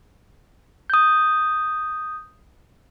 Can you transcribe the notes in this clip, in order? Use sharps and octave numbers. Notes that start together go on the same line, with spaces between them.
D#6 G6